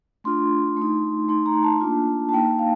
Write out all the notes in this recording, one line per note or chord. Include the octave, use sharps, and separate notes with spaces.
A3 D4 F4 C6
A3 D#4
A3 D#4 C6
A#5
A5
A#3 D4 F4
A5
A#3 D#4 G5
F5